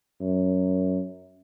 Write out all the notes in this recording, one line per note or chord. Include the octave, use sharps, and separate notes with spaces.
F#2